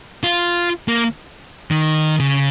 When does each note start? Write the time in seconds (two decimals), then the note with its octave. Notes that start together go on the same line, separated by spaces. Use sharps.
0.23 F4
0.88 A#3
1.71 D#3
2.20 C#3